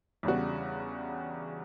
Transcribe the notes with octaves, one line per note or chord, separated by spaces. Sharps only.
E2 C#3 G3 D4 F#4